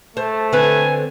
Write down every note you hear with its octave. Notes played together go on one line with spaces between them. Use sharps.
A3 C5 A5
D3 C4 B4 G#5